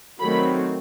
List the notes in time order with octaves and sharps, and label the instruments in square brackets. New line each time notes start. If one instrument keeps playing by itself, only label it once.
[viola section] D#3 F#3 A3 C4 B5